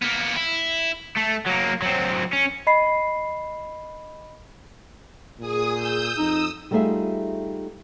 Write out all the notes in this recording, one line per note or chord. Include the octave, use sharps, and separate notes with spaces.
A#3 B3
E4
A3
F#3 A#3
F#3 C4
C#4
D#5 B5 C7
A#2 G#4 D#6
D#6 E6 G6
F2 D#4 D#6 E6
G3 A3 D#4 F4 G#4 E5